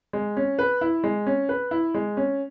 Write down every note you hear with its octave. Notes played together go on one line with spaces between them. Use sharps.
G#3
C#4
B4
E4
G#3
C#4
B4
E4
G#3
C#4